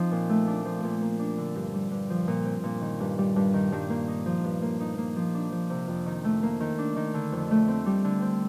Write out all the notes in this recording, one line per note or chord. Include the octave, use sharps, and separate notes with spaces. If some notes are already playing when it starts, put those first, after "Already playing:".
Already playing: F3 C4 D#4
A#2
A3
D4
F3
A#2
A#3
D4
D3
G2
G3
G2
F3
A#2
C4
A#2
D#3
G2
G3
G2
D#3
G2
A#3
D#4
F3
G2
A#3
D#4
A#3
F3
D4
F3
C3
F2
D#3
A3
A#3
D#3
D4
D#3
D3
F2
A3
C4
G3
D3
C4